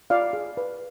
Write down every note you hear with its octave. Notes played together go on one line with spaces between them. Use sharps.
F4 D5 F5
G#4
B4